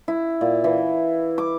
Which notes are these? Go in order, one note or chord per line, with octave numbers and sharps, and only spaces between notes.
E4
A#2
E3
D6